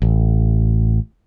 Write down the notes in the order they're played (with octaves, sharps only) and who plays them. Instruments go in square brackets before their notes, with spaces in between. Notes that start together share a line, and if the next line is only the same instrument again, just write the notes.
[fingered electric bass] A1